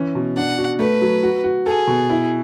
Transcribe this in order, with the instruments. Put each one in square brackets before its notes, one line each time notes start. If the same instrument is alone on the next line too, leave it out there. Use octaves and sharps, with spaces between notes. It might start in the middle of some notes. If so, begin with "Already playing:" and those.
Already playing: [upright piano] E3 C#4
B2
[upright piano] D4 [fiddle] F#5
[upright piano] F#4
[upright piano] A3 [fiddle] B4
[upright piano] F#3
F#4
F#4
[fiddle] G#4 [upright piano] A4
[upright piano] B2
E4